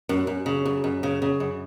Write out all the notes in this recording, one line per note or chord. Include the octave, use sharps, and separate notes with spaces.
F#2
F#2
C#3
F#2
F#2
C#3
C#3
F#2